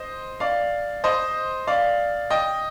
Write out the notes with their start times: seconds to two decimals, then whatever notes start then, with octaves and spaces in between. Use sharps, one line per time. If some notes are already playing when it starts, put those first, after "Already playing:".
Already playing: C5 D#5
0.40 D5 F5
1.04 C5 D#5
1.67 D5 F5
2.30 D#5 G5